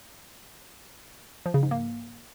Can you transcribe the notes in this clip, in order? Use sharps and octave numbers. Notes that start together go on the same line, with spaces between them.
F3
C#3
G#2
A#3